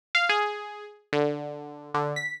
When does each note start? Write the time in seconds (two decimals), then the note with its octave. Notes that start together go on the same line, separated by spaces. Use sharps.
0.15 F5
0.29 G#4
1.13 D3
1.94 D3
2.16 B6